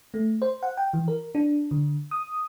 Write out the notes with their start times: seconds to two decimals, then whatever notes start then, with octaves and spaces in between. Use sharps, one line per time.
0.14 A3
0.42 C5
0.63 F#5
0.77 G5
0.93 E3
1.08 A#4
1.35 D4
1.71 D3
2.11 D#6